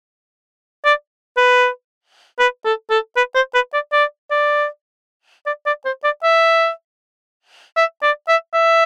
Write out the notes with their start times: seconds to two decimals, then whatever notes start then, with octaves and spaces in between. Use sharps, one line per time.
0.85 D5
1.37 B4
2.39 B4
2.65 A4
2.90 A4
3.16 B4
3.35 C5
3.54 B4
3.73 D5
3.93 D5
4.31 D5
5.46 D5
5.66 D5
5.85 C5
6.04 D5
6.23 E5
7.77 E5
8.03 D5
8.28 E5
8.54 E5